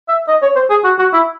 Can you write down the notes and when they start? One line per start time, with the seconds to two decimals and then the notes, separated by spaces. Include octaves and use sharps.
0.09 E5
0.28 D#5
0.42 C#5
0.56 C5
0.70 G#4
0.85 F#4
0.99 F#4
1.13 E4